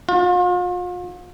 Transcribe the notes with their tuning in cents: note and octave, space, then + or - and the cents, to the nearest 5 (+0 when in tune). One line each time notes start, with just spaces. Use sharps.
F4 +40